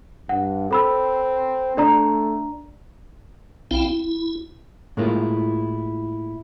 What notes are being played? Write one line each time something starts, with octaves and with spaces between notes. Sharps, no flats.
G2 F#5
C4 A4 B5 E6
A3 D4 D5 A#5
B1 C4 E4 F5 G5
E4
A2 G#3 A#3 E4 F4